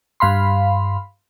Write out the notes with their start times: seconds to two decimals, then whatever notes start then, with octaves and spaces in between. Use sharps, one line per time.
0.20 G2 F5 B5 C6